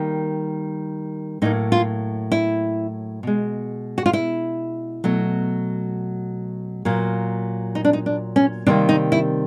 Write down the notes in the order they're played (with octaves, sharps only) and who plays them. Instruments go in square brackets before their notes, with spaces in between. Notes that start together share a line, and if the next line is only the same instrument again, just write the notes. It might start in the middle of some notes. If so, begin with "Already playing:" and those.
Already playing: [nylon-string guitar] D#3 G3 A#3
A2 F#3 A#3 D#4
F4
E4
B2 G#3
F#4
F4
E4
B2 F#3 A3
A#2 F#3 A#3
D#4
D4
D#4
D4
C#4
C3 D#3 G3 A#3 D4
D#4
E4